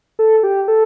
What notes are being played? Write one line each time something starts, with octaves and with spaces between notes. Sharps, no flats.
A4
G4
A4